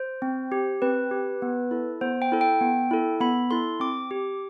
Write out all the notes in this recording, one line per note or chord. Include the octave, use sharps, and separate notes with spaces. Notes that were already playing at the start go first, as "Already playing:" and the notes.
Already playing: C5
C4
G4
C4 B4
G4
B3
E4 A4
B3 C5
G5
E4 A4
G5
B3
E4 A4
B3 B5
E4 A4 C6
C4 D6
G4